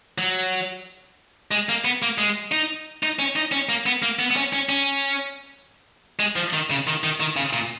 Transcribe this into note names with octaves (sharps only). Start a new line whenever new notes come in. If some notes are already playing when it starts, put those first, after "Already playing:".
F#3
G#3
A#3
B3
A#3
G#3
D#4
D#4
C#4
D#4
C#4
A#3
B3
A#3
B3
B3
C#4
C#4
C#4
G#3
F3
D#3
C#3
D#3
D#3
D#3
C#3
A#2